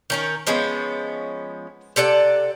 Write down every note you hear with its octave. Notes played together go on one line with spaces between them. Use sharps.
D#3 C#4 A#4
F3 G#3 B3 C#4
C3 A4 D5 F#5